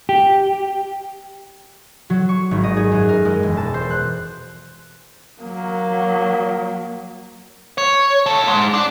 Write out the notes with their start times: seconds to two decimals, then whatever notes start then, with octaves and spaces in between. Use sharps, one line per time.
0.09 G4
2.10 F#3
2.29 C#6
2.51 G#1
2.64 D#5
2.76 G#4
2.92 F#2
3.09 A#4
3.25 G#3
3.43 E1
3.57 A5
3.74 C5
3.90 F#6
5.42 F#3 A#3
7.78 C#5
8.26 D#2 A4
8.47 G#2
8.74 D4